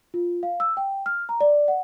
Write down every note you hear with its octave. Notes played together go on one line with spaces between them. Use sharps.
F4
F5
E6
G5
F6
A#5
D5
F#5